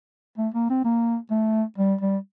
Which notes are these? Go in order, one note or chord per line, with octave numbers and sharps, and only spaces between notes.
A3
A#3
C4
A#3
A3
G3
G3